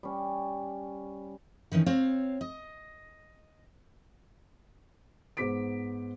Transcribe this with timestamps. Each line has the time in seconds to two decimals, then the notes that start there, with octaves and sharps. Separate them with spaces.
0.03 G3 C#4
1.72 D#3 E3 C#4 D#4
1.86 C4 C#5 F5 A5
2.41 D#5
5.37 G#2 B3 C5 D6 B6 D7